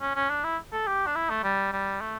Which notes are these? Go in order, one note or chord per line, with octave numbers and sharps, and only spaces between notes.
C#4
C#4
D4
E4
A4
G4
D4
E4
A3
G3
G3
A3